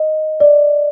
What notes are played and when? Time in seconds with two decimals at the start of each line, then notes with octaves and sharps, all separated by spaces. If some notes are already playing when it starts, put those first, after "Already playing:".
Already playing: D#5
0.40 D5